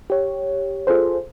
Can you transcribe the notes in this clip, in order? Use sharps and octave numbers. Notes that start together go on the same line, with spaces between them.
G4 C#5
F4 G#4 A4 C5